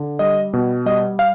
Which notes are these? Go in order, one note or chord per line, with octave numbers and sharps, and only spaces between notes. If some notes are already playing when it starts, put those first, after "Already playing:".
Already playing: D3
G3 D#5
B2
G3 D#5
F5